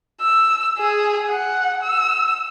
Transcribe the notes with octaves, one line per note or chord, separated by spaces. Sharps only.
E6
G#4
F#5
E6